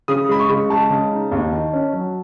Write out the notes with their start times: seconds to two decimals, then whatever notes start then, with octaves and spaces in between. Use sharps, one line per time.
0.08 C#3 D#6
0.29 G#3 B5
0.39 C#6
0.49 C#3
0.70 G#3 A5
0.90 C#3
1.11 D#4
1.31 D#2
1.52 D#3
1.73 C#4
1.93 F#3